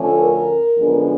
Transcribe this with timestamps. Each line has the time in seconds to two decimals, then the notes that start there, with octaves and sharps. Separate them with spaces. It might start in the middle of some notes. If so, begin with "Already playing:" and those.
Already playing: D2 D3 F3 A3 C#4
0.18 A#4
0.78 F#2 D3 F3 G#3 B3